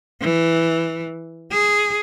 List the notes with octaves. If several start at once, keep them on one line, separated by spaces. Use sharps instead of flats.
E3
G#4